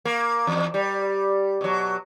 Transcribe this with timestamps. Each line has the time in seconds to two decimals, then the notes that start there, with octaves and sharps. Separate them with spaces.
0.05 A#3
0.47 E2
0.74 G3
1.61 B2 F#3